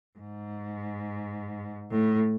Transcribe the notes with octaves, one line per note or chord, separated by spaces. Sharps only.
G#2
A2